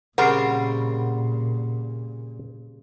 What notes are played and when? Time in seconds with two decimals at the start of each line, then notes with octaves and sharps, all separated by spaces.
0.18 A#2 C#3 G3 C4 A#4 F#5 B5 C7